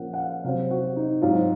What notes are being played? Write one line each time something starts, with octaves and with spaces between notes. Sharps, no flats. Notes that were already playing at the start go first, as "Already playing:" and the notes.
Already playing: A#2 F3 A#3 C#4 F#5
F#5
F5
C3 F#3 C4 F5
F#4
D#4
G#2 F#3 C4 F4